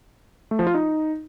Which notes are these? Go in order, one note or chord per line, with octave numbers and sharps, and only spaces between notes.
A3
F3
F4
D#4